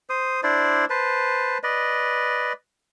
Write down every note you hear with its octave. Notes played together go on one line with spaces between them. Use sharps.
C5 D#6
D4 E4 C5 D5
B4 C5 A5
B4 D5 D#5